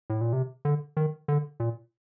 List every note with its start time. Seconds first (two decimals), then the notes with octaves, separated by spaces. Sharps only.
0.10 A2
0.21 A#2
0.33 C3
0.65 D3
0.97 D#3
1.28 D3
1.60 A#2